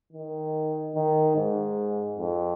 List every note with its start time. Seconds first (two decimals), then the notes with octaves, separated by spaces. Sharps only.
0.13 D#3
0.95 D#3
1.36 G#2
2.18 F2